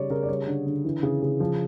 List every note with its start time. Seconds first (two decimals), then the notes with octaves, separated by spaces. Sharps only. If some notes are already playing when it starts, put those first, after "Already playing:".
Already playing: C#3 G3 C#5 D5
0.10 C#3 A#4
0.23 D5
0.29 G3 C#5
0.47 D3
0.67 D3
0.85 E3
1.03 C#3
1.22 C#3
1.40 F3